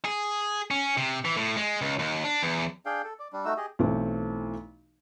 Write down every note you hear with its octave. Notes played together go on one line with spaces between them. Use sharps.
G#4
C#4
C3
E3
A2
G#3
C#2
D#2
D4
E2
D4 G#4 F5 G5
A4
D5
G3 D4
A3 D#4 F#4 E6
G4 G#4 D#5
B1 E3 A3 C4